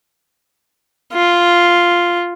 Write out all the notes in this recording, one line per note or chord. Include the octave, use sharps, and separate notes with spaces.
F4